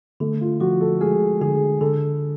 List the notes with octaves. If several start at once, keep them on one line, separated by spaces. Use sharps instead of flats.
D3 A3
F4
F3 F#4
A4
G#3 G#4
D3 G#4
D3 A4